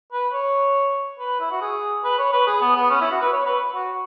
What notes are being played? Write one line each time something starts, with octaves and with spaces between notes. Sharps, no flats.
B4
C#5
B4
E4
F#4
G#4
B4
C#5
B4
G#4
B3
B3
C#4
E4
F#4
B4
C#5
B4
F#4